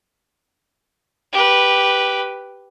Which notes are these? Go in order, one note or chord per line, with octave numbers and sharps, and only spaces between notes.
G4 B4